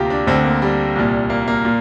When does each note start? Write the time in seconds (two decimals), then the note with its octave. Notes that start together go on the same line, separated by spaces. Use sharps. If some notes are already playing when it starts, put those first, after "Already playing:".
Already playing: D2 C3 A#3 F4 G4
0.10 D4
0.27 D2 D3 C4
0.44 A#3
0.62 G3
0.96 C2 A#2
1.30 A#3
1.48 A#3
1.65 A#2